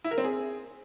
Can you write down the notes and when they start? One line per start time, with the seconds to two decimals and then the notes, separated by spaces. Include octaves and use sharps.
0.04 E4
0.11 A#4
0.18 C4
0.24 G#4